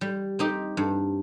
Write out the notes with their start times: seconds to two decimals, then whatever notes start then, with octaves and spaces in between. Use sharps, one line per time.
0.01 G3
0.39 C4 D#4 G4
0.77 G2